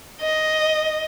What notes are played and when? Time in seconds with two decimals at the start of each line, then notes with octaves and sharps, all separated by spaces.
0.21 D#5